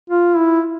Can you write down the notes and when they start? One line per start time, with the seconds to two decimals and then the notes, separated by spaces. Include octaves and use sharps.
0.10 F4
0.37 E4